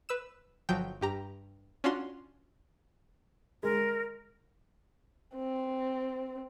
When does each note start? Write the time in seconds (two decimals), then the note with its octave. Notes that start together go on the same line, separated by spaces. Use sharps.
0.09 B4 E6 E7
0.69 G1 F3 F#3 G5
1.01 G2 G4 A#5
1.84 C#4 D4 F4 F#4 C6
3.63 G#3 A#4
5.35 C4